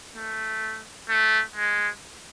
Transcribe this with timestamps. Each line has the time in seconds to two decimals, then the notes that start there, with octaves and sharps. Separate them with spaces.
0.17 A3
1.09 A3
1.56 G#3